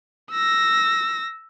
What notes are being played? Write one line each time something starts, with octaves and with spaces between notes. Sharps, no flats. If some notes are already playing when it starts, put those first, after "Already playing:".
E6 A#6